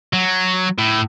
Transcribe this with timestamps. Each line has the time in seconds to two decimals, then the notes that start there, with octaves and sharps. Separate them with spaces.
0.13 F#3
0.79 A2